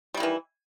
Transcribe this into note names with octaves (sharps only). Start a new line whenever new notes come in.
D#3 E3 G3 E4